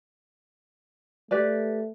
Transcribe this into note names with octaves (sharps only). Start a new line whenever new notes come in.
A3 G4 B4 D5